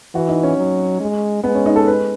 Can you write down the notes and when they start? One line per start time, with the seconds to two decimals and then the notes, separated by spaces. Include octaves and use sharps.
0.15 E3 F#4
0.29 D#4
0.43 C#4
0.58 F#3
1.01 G#3
1.44 G#3 B3
1.55 C#4
1.66 D#4
1.76 A4
1.88 B4